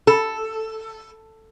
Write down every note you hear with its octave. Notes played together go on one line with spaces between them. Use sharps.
A4